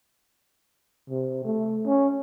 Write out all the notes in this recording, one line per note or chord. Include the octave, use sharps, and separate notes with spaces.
C3
A3
C#4